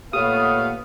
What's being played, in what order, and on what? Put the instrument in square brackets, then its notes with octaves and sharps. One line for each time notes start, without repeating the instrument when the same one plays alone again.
[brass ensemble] A#2 A3 B3 [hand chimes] G4 A4 C#5 [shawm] F5 [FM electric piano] D#6